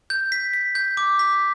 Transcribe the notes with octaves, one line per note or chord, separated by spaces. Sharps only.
G6
B6
B6
G6
D6
B6